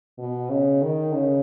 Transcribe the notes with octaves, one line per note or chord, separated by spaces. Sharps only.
B2
C#3
D#3
C#3